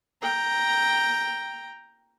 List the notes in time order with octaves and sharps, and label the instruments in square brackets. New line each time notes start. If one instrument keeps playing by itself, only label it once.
[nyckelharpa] G5 A#5